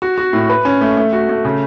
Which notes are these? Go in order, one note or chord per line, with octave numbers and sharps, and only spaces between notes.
F#4
F#4
A2
B4
C#4
A3
A3
F#4
A3
C#3